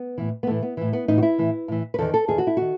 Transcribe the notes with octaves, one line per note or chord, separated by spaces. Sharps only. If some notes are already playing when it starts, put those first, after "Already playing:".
Already playing: B3
A2 E3
B3
A2 E3 A3
B3
A2 E3
B3
A2 E3 D#4
F#4
E4
A2 E3
A2 E3
B4
E2 D#3 A4
A4
E2 D#3 G#4
F#4
E4
D#3 F#4